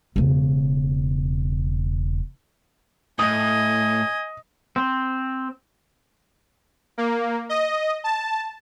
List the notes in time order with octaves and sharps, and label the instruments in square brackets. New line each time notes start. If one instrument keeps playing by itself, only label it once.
[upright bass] E1 C#3
[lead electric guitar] A2 [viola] D#5 [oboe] G#5 [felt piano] D#6
[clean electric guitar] C4
[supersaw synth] A#3
D#5
A5